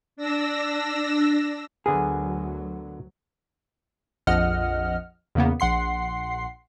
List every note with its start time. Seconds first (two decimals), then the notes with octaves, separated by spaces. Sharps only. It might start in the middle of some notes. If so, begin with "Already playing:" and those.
0.17 D4 E6 A#6
1.86 D2 D3 F#3 B3 G#4 A#4
4.27 A#1 F2 F3 D#5 F#5 F6
5.35 E2 C#3 A#3 B3
5.60 A#1 F#5 C6 C7